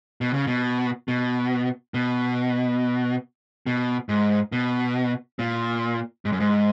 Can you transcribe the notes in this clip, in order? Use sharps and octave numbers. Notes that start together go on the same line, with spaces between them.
B2
C#3
B2
B2
B2
B2
G#2
B2
A#2
G#2
F#2
G#2